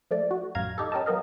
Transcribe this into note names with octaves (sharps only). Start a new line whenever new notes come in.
F3 A3 D5
F#4
A1 F#2 F5 A#5 G#6
D#4 G4 A4
C#4 G4 A#4 D#5 A5
F#3 B3 A#4 D#5 F5